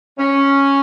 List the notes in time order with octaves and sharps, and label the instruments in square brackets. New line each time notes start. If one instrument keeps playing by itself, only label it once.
[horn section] C#4